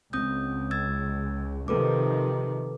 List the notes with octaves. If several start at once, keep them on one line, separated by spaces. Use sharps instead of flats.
C#2 C4 D#6 G6
E6 G#6 A6
C3 D#3 F3 A4 B4 D6